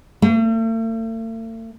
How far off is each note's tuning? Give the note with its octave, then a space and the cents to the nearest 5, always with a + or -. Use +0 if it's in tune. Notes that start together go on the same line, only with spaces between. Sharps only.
A3 +45